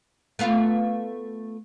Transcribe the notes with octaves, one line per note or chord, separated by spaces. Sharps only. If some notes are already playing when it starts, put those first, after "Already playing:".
A3 B3 F4